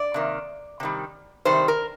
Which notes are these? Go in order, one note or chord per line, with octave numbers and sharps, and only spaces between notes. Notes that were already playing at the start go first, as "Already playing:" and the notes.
Already playing: D5
C3 D#3 A#3
C3 D#3 G3
C3 D#3 G3 C5
A#4